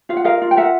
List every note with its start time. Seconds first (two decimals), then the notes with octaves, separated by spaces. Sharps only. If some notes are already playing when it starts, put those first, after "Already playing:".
0.09 F4 F5
0.17 F#5
0.25 A#4 D#5 F5
0.42 F4
0.51 G5
0.57 A#4 E5 F#5